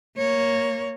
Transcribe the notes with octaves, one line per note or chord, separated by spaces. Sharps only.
A#3 C#5